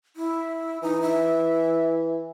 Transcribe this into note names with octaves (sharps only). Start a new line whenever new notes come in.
E4
E3 D#4
E5